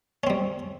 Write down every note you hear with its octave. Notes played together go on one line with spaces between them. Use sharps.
G3 C4 C#4